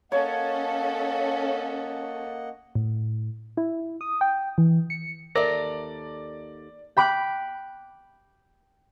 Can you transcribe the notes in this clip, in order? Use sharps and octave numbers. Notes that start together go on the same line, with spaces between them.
A#3 C#4 A4 C#5 D#5 F5 F#5
A2
E4
D#6
G5
E3
C#7
D#2 A4 A#4 D5 E5 A#5
G5 B5 D6 F#6